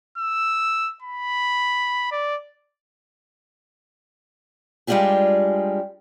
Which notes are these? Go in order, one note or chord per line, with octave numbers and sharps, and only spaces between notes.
E6
B5
D5
G3 G#3 D4 F4 G4 G#4